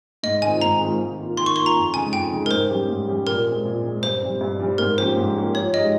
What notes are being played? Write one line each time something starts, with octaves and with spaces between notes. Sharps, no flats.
G#2 D#5
D#3 G#3 C4 F4 G#5
G#2 A#5
D#3 G#3 C4 F4
D#3
A#3 F4
D#3 C6
C#6
A#3 F4 C6
A#5
F2
C#3 G#3 D#4 G#5
F2 G5
C#3 G#3 D#4
A#4
G#2 C5
G3 C#4 G4
G#2
G3 C#4 G4
A#2 A#4
G#3 C4
A#2
G#3 C4
G2 C5
G3 C4
G2
G3 C4
G#2 A#4
F3 A#3 C#4 G4 C5
G#2
F3 A#3 C#4 G4
F3 C#5
G#3 D#4 G4 D#5